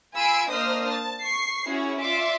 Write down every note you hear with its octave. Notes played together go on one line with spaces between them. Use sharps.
F4 G#5 B5 E6 C7 D7
A#3 D4 C5 D#5 D#6 F6
A5
C#6 C7
C#4 E4 F#4 G#4 C#5
F4 D5 E5 C6 D6